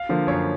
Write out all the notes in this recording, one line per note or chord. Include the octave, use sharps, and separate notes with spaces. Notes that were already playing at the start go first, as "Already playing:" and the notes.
Already playing: F5
D3 F3 A#3
F#2 C#5